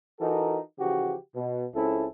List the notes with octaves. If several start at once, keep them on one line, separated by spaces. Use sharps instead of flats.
E3 D#4 F4 F#4 A4 A#4
C#3 E3 F3 F#4 G4
B2
C#2 C4 C#4 E4 A4